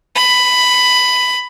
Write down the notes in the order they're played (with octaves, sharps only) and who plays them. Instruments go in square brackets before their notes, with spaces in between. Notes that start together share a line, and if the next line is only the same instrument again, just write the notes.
[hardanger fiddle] B5